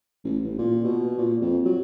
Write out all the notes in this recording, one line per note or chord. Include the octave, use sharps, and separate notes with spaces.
A1
A1
A#2
B2
A#2
F2
F#3